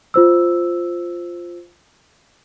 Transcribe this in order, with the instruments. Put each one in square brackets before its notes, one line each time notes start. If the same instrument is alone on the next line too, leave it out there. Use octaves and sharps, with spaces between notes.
[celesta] F4 C5 E6